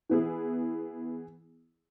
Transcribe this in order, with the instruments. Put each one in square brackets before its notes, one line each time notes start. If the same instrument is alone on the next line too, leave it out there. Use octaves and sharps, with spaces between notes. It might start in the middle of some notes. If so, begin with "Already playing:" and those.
[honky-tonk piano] E3 B3 E4 G#4